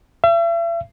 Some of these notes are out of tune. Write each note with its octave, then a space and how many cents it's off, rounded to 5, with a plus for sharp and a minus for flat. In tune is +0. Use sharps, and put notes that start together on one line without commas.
E5 +40